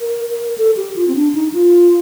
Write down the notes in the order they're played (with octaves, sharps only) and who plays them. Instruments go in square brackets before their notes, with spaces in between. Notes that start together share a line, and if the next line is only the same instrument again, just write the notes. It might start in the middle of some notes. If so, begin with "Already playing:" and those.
[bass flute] A#4
A#4
A4
G4
F4
C4
D4
D#4
F4